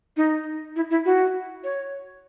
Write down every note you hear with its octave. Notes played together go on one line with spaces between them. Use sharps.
D#4
E4
E4
F#4
C#5